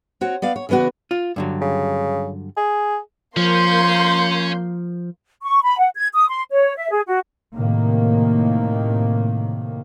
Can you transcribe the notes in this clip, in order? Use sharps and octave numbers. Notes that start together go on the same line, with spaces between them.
C4 F#4 C#5
B3 D5 F5
C#5
C#3 E3 B3 D4 F#4
F4
G2 D3 F#3
C#3
G#4
F3 A#3 C#4 C6 G6
C#6
B5
F#5
G#6
D#6
C6
C#5
E5
G#4
F#4
A2 C3 D#3 A#3